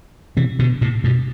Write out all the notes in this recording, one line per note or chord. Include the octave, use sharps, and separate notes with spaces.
C3 E3
B2 D3
A2 C3
G2 B2